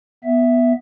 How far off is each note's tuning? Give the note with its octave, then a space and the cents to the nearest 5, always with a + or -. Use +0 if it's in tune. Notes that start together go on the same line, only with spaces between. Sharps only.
B3 +0 E5 +0